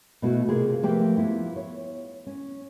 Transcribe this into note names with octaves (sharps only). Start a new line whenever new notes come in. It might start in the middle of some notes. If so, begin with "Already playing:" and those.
B2 A3 E4 F#4
C3 A#3 F4 G#4
F3 A3 A#3 G4 B4 G5
B3 E4 F4
C#5
C#4